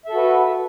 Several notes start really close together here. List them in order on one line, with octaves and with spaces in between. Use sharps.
E5 A4 F#4 B4